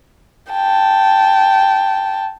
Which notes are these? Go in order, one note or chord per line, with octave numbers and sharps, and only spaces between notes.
G5 A5